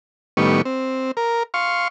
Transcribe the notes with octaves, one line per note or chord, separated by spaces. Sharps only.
A2 D#3 G3 B3 C#6
C4
A#4
F5 C6 C#6